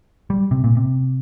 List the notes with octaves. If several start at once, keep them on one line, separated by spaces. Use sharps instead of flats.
G3
C3
A#2
C3